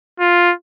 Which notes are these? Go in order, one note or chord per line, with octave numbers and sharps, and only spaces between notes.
F4